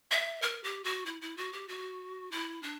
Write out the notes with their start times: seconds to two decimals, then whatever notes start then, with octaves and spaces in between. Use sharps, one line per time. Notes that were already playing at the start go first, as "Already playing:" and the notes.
0.11 E5
0.42 A#4
0.64 G4
0.84 F#4
1.06 E4
1.22 E4
1.37 F#4
1.53 G4
1.68 F#4
2.32 E4
2.63 D4